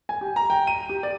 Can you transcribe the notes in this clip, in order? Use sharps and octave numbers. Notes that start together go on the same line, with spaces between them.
G#5
G4
A#5
G5
D#7
G4
D5